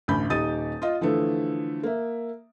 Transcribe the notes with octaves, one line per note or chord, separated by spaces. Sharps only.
A1 D2 B5 G6
D#1 D#4 G4 D#6 A6 D#7
F4 D#5
D3 E3 F3 A3
A#3 E5